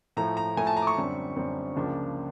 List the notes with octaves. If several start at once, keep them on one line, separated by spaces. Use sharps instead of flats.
A2 F3 A3 A#5
A#5
A2 F3 A3 G#5
A5
A#5
D6
C#6
F#2 D3 G3 C4
F#2 D3 G3 C4
C#2 C#3 F3 A#3 D4